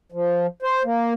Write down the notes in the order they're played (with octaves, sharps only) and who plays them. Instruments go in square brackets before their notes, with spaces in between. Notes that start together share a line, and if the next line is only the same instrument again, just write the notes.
[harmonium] F3
C5
A#3